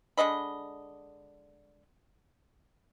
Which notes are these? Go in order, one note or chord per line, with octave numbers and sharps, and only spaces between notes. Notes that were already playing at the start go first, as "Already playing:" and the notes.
D3 G#3 D#5 B5